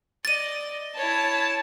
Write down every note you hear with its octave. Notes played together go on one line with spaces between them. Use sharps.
D5 D#5 A6 D#7
E4 C#5 A5